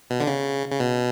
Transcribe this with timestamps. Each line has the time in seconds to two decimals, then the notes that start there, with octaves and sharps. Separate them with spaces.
0.10 B2
0.20 D3
0.27 C#3
0.71 C#3
0.80 B2